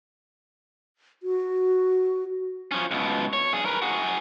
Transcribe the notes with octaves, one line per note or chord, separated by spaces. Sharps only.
F#4
F3 C#4
C#2 B2
C#5
G2 G#4
A#4 B4
F#4 G#4